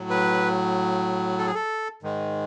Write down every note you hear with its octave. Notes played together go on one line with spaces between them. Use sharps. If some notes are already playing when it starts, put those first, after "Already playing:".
Already playing: A2 F#3
B4
A4
G#4
A4
G#2 D#3 G#3